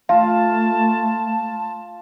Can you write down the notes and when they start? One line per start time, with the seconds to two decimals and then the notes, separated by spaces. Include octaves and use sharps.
0.09 A3 F4 F5 A5